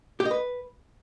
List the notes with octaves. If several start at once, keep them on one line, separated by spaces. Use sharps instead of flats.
G4
D#5
B4